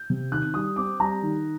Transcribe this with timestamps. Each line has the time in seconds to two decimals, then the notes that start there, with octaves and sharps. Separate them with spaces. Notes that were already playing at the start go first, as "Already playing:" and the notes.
Already playing: G6
0.10 C3
0.32 D#3 F#6
0.54 G3 D#6
0.76 C4 D6
1.00 G3 A#5
1.22 D#3